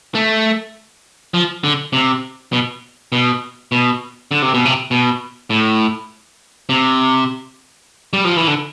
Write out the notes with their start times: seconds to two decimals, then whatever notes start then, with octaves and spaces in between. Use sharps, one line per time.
0.15 A3
1.34 F3
1.64 D3
1.93 C3
2.53 B2
3.12 B2
3.72 B2
4.31 D3
4.42 C3
4.54 B2
4.65 C3
4.91 B2
5.50 A2
6.69 C3
8.13 G3
8.25 F3
8.37 E3
8.48 D3